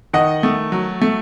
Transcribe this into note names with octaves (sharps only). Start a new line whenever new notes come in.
D#3 D#5 F#5
A3
F#3
A3